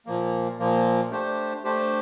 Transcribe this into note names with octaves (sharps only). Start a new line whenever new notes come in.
A#2 F3 A#3
A#2 F3 A#3
A3 D4 G4 C5
A3 D4 G4 C5